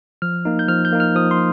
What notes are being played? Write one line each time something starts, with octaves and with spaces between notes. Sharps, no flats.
F3 F6
A#3 D#4
G6
F3 F6
G6
A#3 D#4
F6
F3 D#6
C6